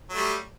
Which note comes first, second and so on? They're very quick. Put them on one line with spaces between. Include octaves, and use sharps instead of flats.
F#3 A3 G3